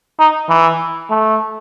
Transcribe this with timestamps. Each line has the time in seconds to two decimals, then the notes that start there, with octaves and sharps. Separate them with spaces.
0.19 D#4
0.49 E3
1.10 A3